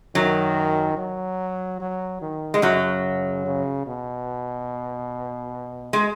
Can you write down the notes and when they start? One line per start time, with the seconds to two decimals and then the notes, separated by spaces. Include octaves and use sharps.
0.15 F#2 D#3 F#3
0.97 F#3
1.81 F#3
2.21 D#3
2.54 G#3
2.62 F#2 C#3 F#3
3.46 C#3
3.87 B2
5.93 G#3